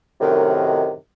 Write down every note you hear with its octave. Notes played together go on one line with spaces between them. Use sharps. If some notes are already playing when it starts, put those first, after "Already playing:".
F#2 A2 C3 D#3